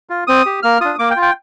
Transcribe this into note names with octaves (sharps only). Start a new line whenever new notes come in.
F4
C4 D#6
G4
A#3 F6
D4 F4 D#6
A#3 D6
G5
F4
G5